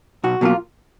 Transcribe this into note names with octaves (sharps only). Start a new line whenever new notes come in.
B1 F#4
B2 F#3 A#3 F4